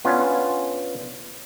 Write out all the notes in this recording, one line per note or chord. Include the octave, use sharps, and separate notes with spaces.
B3 C#4 D4 F4